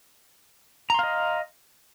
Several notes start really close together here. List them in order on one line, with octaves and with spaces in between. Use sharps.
A#5 C6 F5 D#5